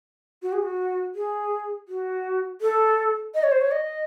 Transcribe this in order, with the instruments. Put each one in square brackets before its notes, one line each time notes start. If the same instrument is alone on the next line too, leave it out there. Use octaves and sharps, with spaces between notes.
[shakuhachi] F#4
G#4
F#4
G#4
F#4
A4
D#5
C#5
C5
C#5
D#5